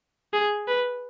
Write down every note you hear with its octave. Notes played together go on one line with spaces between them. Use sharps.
G#4
B4